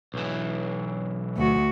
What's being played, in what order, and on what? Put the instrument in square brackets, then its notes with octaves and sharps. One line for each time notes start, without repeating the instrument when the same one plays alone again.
[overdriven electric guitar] B1 E3
[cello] D2 F#4